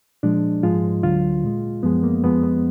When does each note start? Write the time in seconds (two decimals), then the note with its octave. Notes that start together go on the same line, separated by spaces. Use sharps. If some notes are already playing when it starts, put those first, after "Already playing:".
0.23 A#2 F3 G#3 D4
0.63 G#2 F3 G#3 F4
1.03 D2 D3 F#3 F4
1.44 A#2 G#3
1.83 F#2 F3 G#3 B3
2.03 A#3
2.24 F2 F3 G#3 B3
2.43 B3